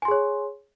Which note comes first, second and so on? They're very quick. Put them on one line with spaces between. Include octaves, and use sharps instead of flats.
G#5 C6 G#4 C#5